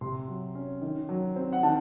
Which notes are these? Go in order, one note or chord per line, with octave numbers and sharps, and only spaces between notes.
C3 C6
F#3
C#4
D#3
F#3
C4
F#5
D#3 A5